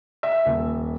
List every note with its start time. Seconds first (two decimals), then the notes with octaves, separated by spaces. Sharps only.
0.23 E5
0.46 D#1